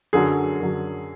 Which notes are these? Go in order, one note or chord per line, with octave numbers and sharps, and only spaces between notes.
F#2 D3 F#3 G#4
F#2 D3 F#3